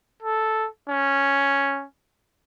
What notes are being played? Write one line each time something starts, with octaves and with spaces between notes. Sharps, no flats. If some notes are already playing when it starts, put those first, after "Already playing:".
A4
C#4